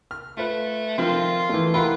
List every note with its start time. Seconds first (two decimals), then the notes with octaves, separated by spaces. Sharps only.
0.11 F6
0.37 A3 F4 B4
0.98 D#3 F3 C4 F4
1.49 E3 A3
1.74 E4 F4 G4 A#4 F#5 B5